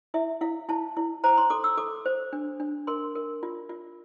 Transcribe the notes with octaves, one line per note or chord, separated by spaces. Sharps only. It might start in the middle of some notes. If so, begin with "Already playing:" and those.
E4 E5
E4 F5
E4 A5
E4
C5 A#5
C6
A4 D6
E6
A4 D6
C5
D4
D4
A#4 C6
A#4
F4
F4